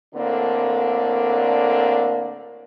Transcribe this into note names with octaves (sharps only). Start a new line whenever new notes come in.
A2 D3 A#3 C4 D4